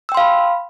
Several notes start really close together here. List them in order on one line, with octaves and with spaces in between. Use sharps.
E6 G5 C6 F5 B5